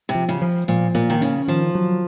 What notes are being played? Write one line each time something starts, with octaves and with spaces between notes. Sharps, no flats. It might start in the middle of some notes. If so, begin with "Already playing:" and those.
C3
F3
C#3
F3
A#2 F3
A#2 A#3
D#3
C#3 C#4
D#3 F3
F#3